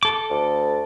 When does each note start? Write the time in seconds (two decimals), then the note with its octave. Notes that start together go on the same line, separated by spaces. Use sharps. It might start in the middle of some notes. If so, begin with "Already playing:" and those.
0.03 A4 D6
0.30 D2